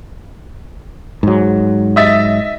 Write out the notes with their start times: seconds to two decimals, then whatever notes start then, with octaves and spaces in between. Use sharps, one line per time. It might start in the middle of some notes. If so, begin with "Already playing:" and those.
1.23 G#2 F#3
1.96 D#5 E5 A6